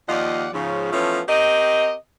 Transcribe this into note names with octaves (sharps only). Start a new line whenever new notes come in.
D#2 F3 F4 D5 D#5 F#5
G#2 C#3 F3
E3 F3 A3 B3 C#4
C4 G4 A#4 D#5